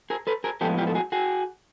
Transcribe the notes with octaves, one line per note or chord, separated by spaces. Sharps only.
G#4 A#4
A4 B4
G#4 A#4
A2 F3 G#3 B3 G4 A4
F4 G4
A4
F#4 G#4
F#4 G#4